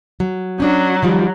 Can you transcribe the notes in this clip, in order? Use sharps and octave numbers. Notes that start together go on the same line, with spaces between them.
F#3
F#3 C#4 D4
D#3 F3 G3